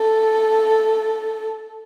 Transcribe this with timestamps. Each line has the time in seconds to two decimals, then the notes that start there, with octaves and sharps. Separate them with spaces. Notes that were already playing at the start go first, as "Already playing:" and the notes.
Already playing: A4